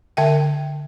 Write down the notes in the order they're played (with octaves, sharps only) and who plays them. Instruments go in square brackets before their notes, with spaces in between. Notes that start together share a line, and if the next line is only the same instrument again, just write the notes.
[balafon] D3 E5 G5